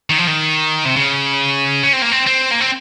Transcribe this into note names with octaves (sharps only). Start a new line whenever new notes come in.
D#3
F3
D#3
C3
C#3
C#4
C4
A#3
C4
C4
A#3
C4